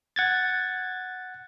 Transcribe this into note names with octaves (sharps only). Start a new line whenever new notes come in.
F#5 G#6 A6